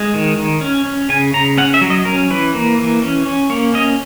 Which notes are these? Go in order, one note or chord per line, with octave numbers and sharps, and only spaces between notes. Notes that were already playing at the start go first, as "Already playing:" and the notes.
Already playing: G#3
D#3
D#3
C#4
C#4
C#3 G#5
C#3 A#5
C#4 F#5
E5
F#3
D#5
C#4 A#4
E3 B4
A#3
E3
C#4
C#4
A#3 C#5
C#4 D#5